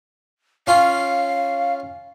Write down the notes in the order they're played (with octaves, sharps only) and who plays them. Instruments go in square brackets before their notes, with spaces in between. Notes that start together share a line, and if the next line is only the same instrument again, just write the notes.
[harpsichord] C#4 F4 [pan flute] F5